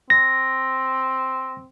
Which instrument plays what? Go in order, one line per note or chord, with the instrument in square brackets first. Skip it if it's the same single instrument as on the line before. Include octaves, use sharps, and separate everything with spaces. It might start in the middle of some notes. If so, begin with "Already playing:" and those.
[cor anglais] C4 [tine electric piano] A#6